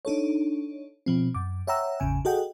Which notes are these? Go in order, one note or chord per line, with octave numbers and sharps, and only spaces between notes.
D4 D#4 A4 C#5
B2 F3 C4
F#2 D6
C#5 E5 F#5 G5 A#5 E6
G#1 E2 C#3 G#5
F#4 G#4 A4 D#5 F#5 G5